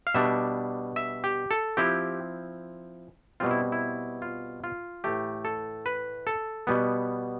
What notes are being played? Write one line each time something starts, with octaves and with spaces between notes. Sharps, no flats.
F5
B2 G3 D4 E5
E5
G4
A4
F3 C4 E4 G4
B2 G3 C4 F4
E4
E4
F4
F4
A2 E3 A3 G4
A4
B4
A4
B2 G3 B3